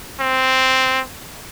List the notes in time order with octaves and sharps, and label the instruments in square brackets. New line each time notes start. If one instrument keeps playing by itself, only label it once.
[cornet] C4